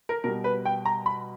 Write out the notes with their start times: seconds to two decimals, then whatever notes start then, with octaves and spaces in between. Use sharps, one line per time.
0.09 A#4
0.24 B2 G3 A#4
0.44 B4
0.65 G5
0.85 A#5
1.06 B5